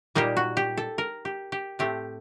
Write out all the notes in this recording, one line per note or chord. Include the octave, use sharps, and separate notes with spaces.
A#2 G3 A#3 D#4 G4
F#4
G4
A4
A#4
G4
G4
A2 A3 C4 G4